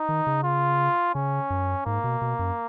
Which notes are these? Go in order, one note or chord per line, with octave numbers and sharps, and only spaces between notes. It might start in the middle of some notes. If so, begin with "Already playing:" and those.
Already playing: D#4
D#3
C#3
F4
C#3 C#4
F#2
G#2 A#3
B2
B2
F#2